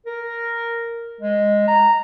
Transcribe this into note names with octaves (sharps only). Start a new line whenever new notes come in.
A#4
G#3
A#5